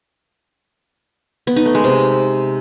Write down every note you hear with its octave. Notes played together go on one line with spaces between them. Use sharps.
B3
D#4
A3
G#3
C3